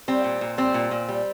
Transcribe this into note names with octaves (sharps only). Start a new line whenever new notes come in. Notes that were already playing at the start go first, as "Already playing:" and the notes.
G3 C4
A#2
A#2
G3 C4
A#2
A#2
G3